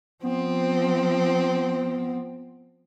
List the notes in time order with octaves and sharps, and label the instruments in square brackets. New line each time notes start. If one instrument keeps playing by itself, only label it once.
[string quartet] F3 C4 [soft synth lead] B3